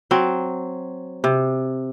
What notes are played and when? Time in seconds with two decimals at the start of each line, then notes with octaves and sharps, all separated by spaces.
0.11 F#3 C4
1.24 C3